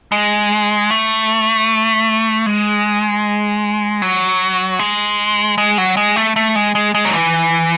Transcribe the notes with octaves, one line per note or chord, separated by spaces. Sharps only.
G#3
A3
G#3
F#3
G#3
G#3
F#3
G#3
A3
A3
G#3
G#3
G#3
F#3
E3